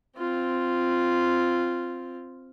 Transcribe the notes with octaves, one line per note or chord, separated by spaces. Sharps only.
C4 F4